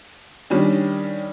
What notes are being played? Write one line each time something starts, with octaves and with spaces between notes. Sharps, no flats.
D#3 G3 C#4 D4